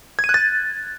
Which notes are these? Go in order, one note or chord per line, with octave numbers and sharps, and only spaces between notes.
G#6
D#7
F#6
A6